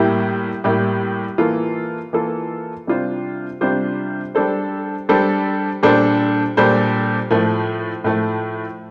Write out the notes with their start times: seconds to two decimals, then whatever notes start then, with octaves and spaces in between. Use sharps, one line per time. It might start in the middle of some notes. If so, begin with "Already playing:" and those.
Already playing: A2 G3 A#3 E4 G4
0.64 A2 G3 A#3 E4 G4
1.38 E3 A#3 F4 A4
2.13 E3 A#3 F4 A4
2.87 C3 G3 D4 F4 C5
3.61 C3 G3 D4 F4 C5
4.35 G3 D4 A4 C5
5.09 G3 D4 A4 C5
5.83 A#2 G3 D4 A4 C5
6.57 A#2 G3 D4 A4 C5
7.31 A2 F3 A3
8.04 A2 F3 A3